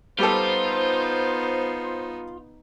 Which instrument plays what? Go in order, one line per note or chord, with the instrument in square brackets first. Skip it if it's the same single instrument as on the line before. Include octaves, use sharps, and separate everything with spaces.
[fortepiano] G3 G4 A4 [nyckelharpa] B3 D#4 [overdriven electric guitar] F4 [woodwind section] C5